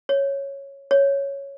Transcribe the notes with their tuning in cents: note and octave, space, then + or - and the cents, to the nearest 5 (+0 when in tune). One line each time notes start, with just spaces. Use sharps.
C#5 -5
C#5 +0